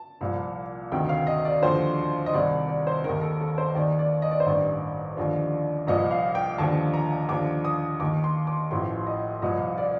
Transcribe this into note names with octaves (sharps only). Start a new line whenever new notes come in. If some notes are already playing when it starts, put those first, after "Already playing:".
Already playing: A5
C2 A#2 F3
D2 C3 D#3 G5
F5
D#5
D5
D#2 D3 F3 C5
D#5
C2 C3 D#3 D5
D5
C5
D#2 D#3 A#4
A4
A4
C5
D#2 D#3 D5
D5
D#5
D5
C5
A1 G2 D#3 D5
D#2 D3 F3
C2 A#2 F3 D#5
F5
G5
D#2 D3 F3 A5
A#5
D#2 D3 F3 D6
D#6
D#2 D#3 D6
C6
D6
A1 A2 F3 C6
D#5
C2 A#2 F3 D#5
D5